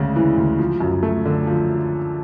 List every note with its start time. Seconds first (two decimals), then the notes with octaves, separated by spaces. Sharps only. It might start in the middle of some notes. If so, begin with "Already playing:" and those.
Already playing: D2 C#3 G#3
0.16 E3
0.37 D2
0.59 F3
0.80 F#2
1.03 A3
1.25 D3
1.47 F3